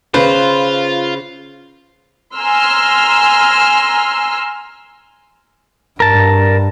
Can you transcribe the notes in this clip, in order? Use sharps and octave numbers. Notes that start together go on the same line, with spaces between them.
C#3 F4 B4 C5
G#5 A#5 C6 E6 F6
G2 A#4 A5